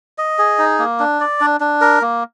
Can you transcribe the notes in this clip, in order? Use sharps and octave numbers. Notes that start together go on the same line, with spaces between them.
D#5
G#4
D#4
A#3
D4
D5
D4
D4
A#4
A#3